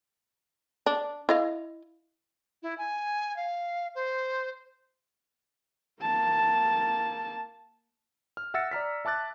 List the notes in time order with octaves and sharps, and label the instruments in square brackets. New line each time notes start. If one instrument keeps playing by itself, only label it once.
[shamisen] D4
E4 D#5 F5
[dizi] E4
G#5
F5
C5
[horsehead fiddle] A#3 A5
[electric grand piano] F6
E5 F#5 E6 A6 A#6 C#7
D5 A#5 F6 B6
E5 A5 D6 F#6 A6